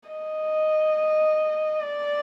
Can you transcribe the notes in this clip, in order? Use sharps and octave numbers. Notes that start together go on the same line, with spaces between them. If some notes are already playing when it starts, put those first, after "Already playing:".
D#5
D5